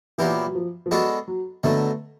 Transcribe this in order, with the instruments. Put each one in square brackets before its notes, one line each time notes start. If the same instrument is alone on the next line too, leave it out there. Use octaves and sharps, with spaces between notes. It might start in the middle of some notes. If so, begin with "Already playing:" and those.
[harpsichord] A#2 F#3 B3 E4 G4 [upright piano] E3
[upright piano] F#3
F3
F3
[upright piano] F#3 [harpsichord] G#3 B3 D4 F#4 A4
[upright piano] F#3
[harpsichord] B2 F#3 A3 [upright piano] D3